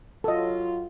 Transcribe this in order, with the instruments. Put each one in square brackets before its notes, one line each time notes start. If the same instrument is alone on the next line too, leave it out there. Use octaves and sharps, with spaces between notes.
[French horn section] F#3 F4 [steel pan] A4 D#5